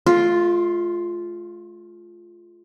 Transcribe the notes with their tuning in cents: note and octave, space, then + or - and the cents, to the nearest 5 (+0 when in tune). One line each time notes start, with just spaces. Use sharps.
A3 -45 F4 +0